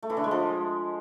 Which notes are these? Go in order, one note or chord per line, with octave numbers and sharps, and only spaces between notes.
A3
E3
D3
G#3
F3